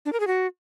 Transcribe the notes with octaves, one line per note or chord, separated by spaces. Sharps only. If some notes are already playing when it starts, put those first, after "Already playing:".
D4
A#4
G#4
F#4